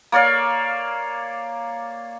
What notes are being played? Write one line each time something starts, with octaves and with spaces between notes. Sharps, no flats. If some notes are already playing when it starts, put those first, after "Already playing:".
A#3 C#5 D5 F5